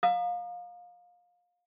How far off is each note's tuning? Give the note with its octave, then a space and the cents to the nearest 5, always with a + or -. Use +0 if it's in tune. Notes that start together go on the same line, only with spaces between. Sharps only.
F5 +25 A#5 +0 D#6 -40